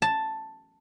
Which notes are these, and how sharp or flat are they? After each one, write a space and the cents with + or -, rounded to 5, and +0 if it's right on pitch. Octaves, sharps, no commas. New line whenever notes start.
A5 +5